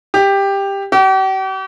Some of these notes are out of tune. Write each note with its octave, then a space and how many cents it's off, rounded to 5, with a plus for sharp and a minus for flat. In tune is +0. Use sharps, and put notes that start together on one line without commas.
G4 +10
G4 -45